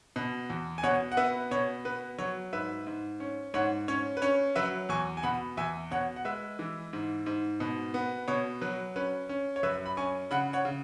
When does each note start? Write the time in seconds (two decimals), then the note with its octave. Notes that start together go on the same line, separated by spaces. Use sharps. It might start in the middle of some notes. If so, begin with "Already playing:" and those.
0.16 B2
0.50 E2
0.78 G#5
0.83 B2 C#5 F#5
1.12 F#5
1.17 B3 B4 E5
1.51 B2 C#5
1.85 B3 B4
2.19 F#3 C#5
2.53 G#2 B4 E5
2.87 G#2
3.20 C#4
3.54 G#2 C#5 F#5
3.88 C#4 C#5
4.17 B4
4.22 C#4 C#5
4.56 F#3 B4 E5
4.89 E2 G#5 C#6
5.17 G#5
5.23 B2 F#5 B5
5.57 E2 E5 G#5
5.91 B2 C#5 F#5
6.16 F#5
6.25 G#3 B4 E5
6.59 E3
6.93 G#2
7.26 G#2
7.60 B2
7.94 B3
8.28 B2 C#5
8.61 F#3 B4
8.96 C#4 B4
9.29 C#4
9.56 C#5
9.63 F#2 B4 E5
9.86 B5
9.97 C#4 G#5 C#6
10.31 C#3 F#5 B5
10.53 C#5 F#5
10.65 C#3